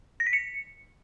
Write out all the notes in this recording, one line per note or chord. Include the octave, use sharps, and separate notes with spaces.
A#6
B6
C#7